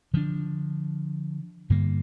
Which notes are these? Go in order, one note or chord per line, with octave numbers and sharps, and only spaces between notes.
D3 F3 D4
G2 D3 G3 A#3